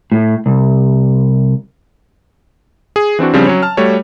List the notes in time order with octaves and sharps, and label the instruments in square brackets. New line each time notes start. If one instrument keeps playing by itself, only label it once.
[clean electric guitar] A2
C2
[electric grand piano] G#4
E3 C4 D4 F#4
C#3 F3 G3 C4 D4
F#3 C#4 C#5
A5 F6
G3 A3 F#4 C#5